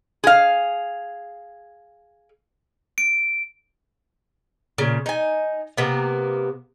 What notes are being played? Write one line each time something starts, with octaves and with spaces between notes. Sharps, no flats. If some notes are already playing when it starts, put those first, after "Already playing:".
G#4 F5
D7
A#2 C#3
D#4 G#5
C3 A#3 B3